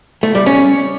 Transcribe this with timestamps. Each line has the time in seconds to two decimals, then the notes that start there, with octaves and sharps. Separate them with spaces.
0.23 A3
0.35 G3
0.46 C#4